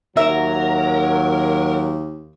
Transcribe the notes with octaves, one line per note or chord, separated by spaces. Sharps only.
D#2 F#3 A#4 E5